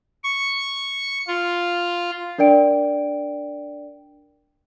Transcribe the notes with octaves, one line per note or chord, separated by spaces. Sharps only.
C#6
F4
D4 A#4 D5 G5 D7